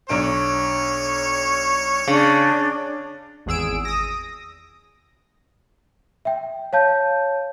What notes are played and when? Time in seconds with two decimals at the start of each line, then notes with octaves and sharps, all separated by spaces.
0.09 B1 D4 C#5 D7
2.08 C#3 D4
3.46 G#1 E2 G#4 E6 D7
3.85 D#6 A#6
6.25 E5 G5
6.73 C#5 F5 A5 G6